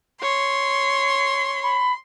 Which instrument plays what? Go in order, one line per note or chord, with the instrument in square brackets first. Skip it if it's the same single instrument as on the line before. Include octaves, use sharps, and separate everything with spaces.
[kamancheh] C#5 [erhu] C6
[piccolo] B5